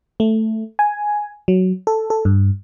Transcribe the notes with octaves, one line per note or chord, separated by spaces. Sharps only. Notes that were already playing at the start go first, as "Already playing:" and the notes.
A3
G#5
F#3
A4
A4
G2